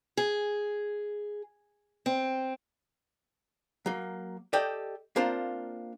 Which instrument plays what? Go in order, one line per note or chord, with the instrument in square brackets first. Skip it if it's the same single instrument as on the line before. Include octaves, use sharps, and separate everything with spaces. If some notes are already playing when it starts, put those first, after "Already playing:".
[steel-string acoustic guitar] G#4
C4
[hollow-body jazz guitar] F#3 A#3
G4 A4 D5 D#5 G5
A#3 C4 D4 F4 A#4 C5